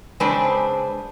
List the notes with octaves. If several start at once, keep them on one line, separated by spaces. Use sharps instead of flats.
C#3 G#3 C4 D4 B4